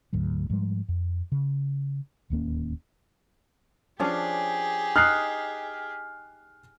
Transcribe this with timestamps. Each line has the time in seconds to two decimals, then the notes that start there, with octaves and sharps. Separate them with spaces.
0.13 D1 D2 G#2 F#3
0.50 G#2 F3 G3 G#3
0.88 F2
1.32 C#3
2.30 D1 D#2 A#3 C#4
4.00 F3 C#4 D4 G4 G#4
4.96 D#4 F6 F#6 C7